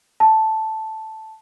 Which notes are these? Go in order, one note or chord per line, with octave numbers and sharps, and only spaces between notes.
A5